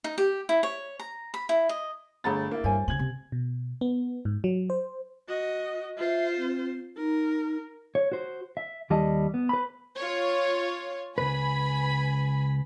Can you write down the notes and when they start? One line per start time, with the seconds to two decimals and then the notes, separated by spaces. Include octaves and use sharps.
0.04 D#4
0.18 G4
0.49 E4
0.63 C#5
0.99 A#5
1.34 B5
1.49 E4
1.69 D#5
2.24 G1 A3 G#4 A#5 B5 A6
2.51 A#3 E4
2.64 G2 C5 C#5 G#5
2.88 A2 C#3 G#6 F#7
2.99 C3
3.32 B2
3.81 B3
4.25 G#2
4.44 F#3
4.70 C5
5.28 F#4 D#5
5.97 F4 C5 E5
6.37 C4
6.96 D#4 A#4
7.95 C#5
8.12 F#4 C5
8.57 E5
8.90 D#2 G3 D5 D#5 A5
9.34 B3
9.49 B4 B5
9.97 F4 C#5
11.18 C#2 G2 B4 G#5 B5